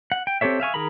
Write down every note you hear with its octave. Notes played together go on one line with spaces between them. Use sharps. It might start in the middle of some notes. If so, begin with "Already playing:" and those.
F#5
G5
C4 G4 A4 C#5 E5
E5 F5 G#5 C#6
D#3 G#4 A#4 A#5 B5